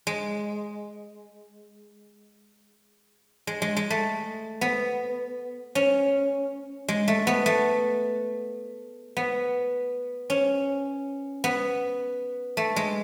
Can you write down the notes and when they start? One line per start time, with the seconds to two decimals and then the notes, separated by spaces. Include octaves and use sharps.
0.07 G#3
3.47 G#3
3.62 G#3
3.77 G#3
3.90 A3
4.61 B3
5.75 C#4
6.88 G#3
7.08 A3
7.27 B3
7.46 A3
9.17 B3
10.30 C#4
11.44 B3
12.57 A3
12.76 G#3